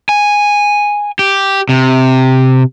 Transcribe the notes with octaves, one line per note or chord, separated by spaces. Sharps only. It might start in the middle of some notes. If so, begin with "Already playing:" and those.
G#5
G4
C3